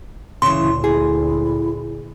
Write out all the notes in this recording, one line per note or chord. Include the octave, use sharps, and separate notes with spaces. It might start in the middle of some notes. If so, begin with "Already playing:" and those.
D2 A#2 C#3 E3 C6
E4 G#4